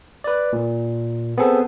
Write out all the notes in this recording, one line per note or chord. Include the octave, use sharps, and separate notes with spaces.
B4 D5
A#2
B3 C4 G#4 A4